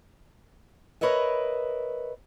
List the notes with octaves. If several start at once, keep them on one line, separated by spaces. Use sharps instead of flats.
A#4 B4 C#5 D#5 E5